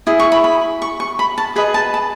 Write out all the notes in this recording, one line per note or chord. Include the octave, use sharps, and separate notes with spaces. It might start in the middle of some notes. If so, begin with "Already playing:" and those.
E4 G#4
C#6
B5
B5
C#6
C#6
B5
A5
G#4 B4 D#5 B5
A5
A5